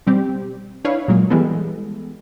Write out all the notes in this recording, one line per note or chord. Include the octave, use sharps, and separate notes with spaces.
B2 G3 C4 G4
D4 E4 B4 C#5 F5
A#2 F#3 G#3 A#3
E3 G3 G#3 B3 A4